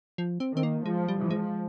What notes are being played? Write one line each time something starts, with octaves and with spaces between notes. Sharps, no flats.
F3
C4
D#3 C4
A#3
F3 G#3
G3
F3
G#3